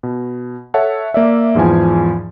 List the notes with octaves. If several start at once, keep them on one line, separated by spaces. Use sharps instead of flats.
B2
A4 C#5 E5 F#5 A5
A#3 D5 E5
E2 G#2 E3 F3 G#5